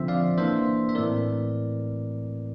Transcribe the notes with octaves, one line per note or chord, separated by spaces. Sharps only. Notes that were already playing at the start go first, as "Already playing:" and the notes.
Already playing: D3 F3 C4 C5 E5
D5 F5
E3 A#3 D4 C5 E5
E5
A2 E3 A3 C4 A#4 D5